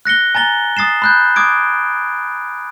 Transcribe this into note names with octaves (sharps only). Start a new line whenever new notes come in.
F#6 A#6 C#7 G7
G#5 A#5 A6 G7
D#6 A6 C7 E7
B5 F#6 G6
D6 D#6 G#6 D7